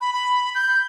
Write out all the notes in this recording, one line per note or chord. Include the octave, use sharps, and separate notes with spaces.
B5
B5
G6